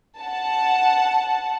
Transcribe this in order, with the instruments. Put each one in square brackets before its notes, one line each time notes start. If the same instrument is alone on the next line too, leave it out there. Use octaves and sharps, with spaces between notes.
[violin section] F#5 A5